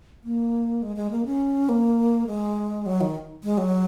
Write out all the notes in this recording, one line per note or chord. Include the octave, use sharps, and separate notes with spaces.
A#3
G#3
G#3
A#3
C#4
A#3
G#3
F#3
D#3
G#3
F#3